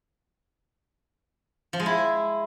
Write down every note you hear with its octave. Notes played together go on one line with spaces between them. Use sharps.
F3
G#3
E4